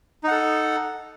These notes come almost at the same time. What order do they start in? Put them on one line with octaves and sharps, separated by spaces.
D#4 F#5 A4